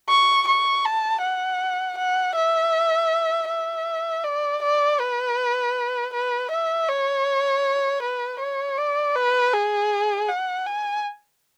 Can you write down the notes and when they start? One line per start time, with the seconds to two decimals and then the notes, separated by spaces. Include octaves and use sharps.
0.09 C#6
0.48 C#6
0.85 A5
1.22 F#5
1.98 F#5
2.36 E5
3.49 E5
4.24 D5
4.62 D5
5.00 B4
6.14 B4
6.51 E5
6.89 C#5
8.02 B4
8.39 C#5
8.77 D5
9.15 B4
9.53 G#4
10.28 F#5
10.66 G#5